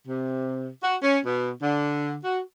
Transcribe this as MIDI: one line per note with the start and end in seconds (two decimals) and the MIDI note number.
0.08 0.69 48
0.83 0.97 66
1.03 1.19 61
1.25 1.51 47
1.62 2.17 50
2.24 2.41 66